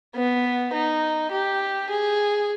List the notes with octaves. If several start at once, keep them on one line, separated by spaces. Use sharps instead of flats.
B3
D#4
G4
G#4